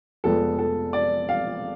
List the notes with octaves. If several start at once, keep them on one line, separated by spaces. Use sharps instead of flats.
F1 F2 F3 G#3 B3 A4
A4
D5
F5